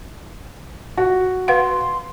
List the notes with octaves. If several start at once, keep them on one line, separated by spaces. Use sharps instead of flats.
F#4
B4 F5 F#5 C6